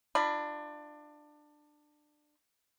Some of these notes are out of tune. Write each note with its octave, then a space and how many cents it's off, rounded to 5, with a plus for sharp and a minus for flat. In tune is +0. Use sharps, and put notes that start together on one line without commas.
D4 +20 F4 -25 B5 +0